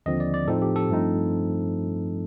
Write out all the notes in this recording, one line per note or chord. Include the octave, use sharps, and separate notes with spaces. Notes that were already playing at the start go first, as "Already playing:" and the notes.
D#2 D3 F3 C4 D#5
D5
D5
A2 F3 C4 D#4 A4
G4
A4
G2 F3 A3 C4 D#4